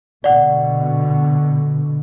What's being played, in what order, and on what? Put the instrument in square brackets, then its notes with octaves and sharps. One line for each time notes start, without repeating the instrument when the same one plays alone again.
[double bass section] B2 D3 [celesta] D5 F#5